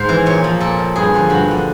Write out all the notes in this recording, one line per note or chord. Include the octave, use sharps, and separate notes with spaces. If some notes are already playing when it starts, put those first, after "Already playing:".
Already playing: G#2 C5
E3
A#2 C#5
F3
A#2 A4
F3
G2 G#4
D3 F3
G2 F#4
D3 F3